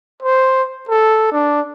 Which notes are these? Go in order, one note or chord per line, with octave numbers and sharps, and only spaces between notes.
C5
A4
D4